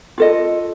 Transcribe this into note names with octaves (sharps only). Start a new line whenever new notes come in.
F4 A4 D#5